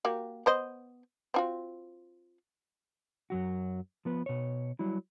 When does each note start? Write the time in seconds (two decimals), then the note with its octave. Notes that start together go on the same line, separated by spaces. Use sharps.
0.05 A#3 F#4 G4
0.46 B3 C5 D#5
1.34 C4 F4 F#4
3.30 F#2 F#3 F#4
4.05 F3 B3 B4
4.26 B2 C#5
4.79 F#3 G3 E4